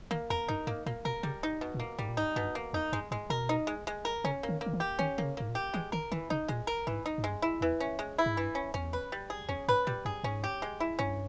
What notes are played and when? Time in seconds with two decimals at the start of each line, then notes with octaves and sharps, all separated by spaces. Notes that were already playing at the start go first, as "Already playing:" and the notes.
0.11 D#3 A#3
0.30 E2 A#4
0.48 G2 D#4
0.67 G#2 A#3
0.86 A#2 A#3
1.05 B2 A#4
1.23 C#3 G3
1.43 D#4
1.61 B2
1.74 A#2
1.80 A#3
1.98 G#2 G3
2.09 A#2
2.17 G#2 D#4
2.36 G2 B2
2.55 A#3
2.73 E2 D#4
2.92 G2 G#3
3.11 G#2 G#3
3.30 B2 A#4
3.49 D#4
3.67 G#3
3.87 G#3
4.05 A#4
4.24 C#3 C#4
4.43 A#3
4.49 D#3
4.61 A#3
4.66 D#3
4.73 E3
4.80 G4
4.99 D#3 C#4
5.18 D#3 A#3
5.24 C#3
5.37 G#2 A#3
5.49 A#2
5.55 G4
5.73 E3 G#3
5.92 D#3 A#4
6.12 D#3 E3
6.30 C#3 D#4
6.48 A#2 G#3
6.67 A#4
6.87 G#2 E3
7.06 D#4
7.18 G#2
7.24 G2 G#3
7.42 E4
7.61 E2 E3
7.80 C#4
7.99 G#3
8.18 E4
8.26 G#2
8.37 G2 E3
8.55 C#4
8.74 E2 C#4
8.93 B4
9.12 G3
9.30 G#4
9.49 E2 C#4
9.68 G#2 B4
9.87 A#2 G3
10.05 G2 G#4
10.24 G#2 C#4
10.44 G4
10.62 G#3
10.80 E4
10.99 G2 C#4